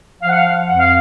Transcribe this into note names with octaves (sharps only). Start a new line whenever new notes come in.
F3 F5
F#5
F5
F2 F#5
F5